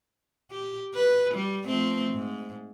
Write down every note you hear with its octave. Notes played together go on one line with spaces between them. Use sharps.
G4
B4
G3
F3 A3 C4
G#2